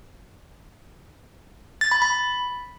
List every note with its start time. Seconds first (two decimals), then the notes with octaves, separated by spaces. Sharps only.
1.81 A6
1.91 B5
2.02 B5